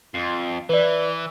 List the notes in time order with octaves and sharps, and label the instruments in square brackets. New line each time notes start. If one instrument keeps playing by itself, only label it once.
[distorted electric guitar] F2 [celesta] C7
[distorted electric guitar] E3 [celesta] B4 D5